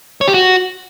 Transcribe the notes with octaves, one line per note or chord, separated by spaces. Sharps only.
C#5
G4
F#4